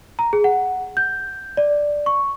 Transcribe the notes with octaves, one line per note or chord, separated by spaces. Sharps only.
A#5
G#4
F#5
G6
D5
C#6